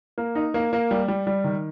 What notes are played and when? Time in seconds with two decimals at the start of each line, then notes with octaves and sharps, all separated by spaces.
0.18 A#3
0.35 D#4
0.54 A#3
0.73 A#3
0.91 G3
1.08 G3
1.27 G3
1.44 D#3